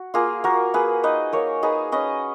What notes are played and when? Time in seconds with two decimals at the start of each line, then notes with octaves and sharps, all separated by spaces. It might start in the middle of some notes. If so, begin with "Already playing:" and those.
Already playing: F#4
0.14 A#3 F4 G#4
0.44 A#3 F#4 A#4
0.74 A#3 G#4 B4
1.04 D#4 B4 D#5
1.32 A#3 A#4 C#5
1.63 D#4 G#4 B4
1.92 C#4 B4 D#5